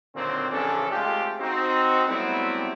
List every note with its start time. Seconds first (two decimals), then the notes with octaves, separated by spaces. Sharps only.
0.15 A#2 D3 D#3 F#3 C4
0.51 A#1 C#3 E3 C#4 D4 A4
0.92 G#3 A3 C4 F4 G4
1.40 C4 D#4 F#4
2.08 F#3 G3 A3 B3 C4 E4